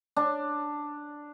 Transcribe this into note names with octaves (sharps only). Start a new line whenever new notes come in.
D4